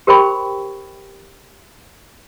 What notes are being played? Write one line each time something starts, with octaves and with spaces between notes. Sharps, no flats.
G4 A#4 C5 G5 B5 C#6